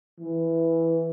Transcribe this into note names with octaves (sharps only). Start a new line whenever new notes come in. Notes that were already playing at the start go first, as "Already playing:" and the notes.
E3